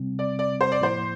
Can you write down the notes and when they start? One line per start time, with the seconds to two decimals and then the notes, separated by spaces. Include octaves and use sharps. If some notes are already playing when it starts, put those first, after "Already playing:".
Already playing: C3 G3 C4
0.19 D5
0.39 D5
0.61 C5
0.72 D5
0.80 A2 F3 A#3 E4 C5